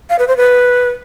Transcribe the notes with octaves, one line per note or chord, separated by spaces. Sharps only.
F5
B4
C5
B4